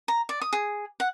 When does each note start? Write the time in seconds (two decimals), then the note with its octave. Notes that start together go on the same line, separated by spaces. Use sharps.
0.08 A#5
0.29 D5
0.42 D#6
0.53 G#4
1.00 F#5